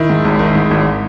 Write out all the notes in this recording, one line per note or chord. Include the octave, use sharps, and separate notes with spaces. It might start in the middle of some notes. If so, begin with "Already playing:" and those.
Already playing: D#3 E4
G#2
G#1
D#3
G#2
G#1